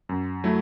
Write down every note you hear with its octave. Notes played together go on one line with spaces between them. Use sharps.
F#2
F#3 A3 E4